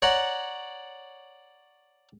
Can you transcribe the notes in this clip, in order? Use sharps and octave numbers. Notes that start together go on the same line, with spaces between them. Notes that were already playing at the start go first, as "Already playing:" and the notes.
C#5 D5 F#5 A#5